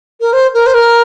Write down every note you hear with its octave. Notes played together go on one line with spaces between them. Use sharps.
A#4
C5
A#4
C5
A#4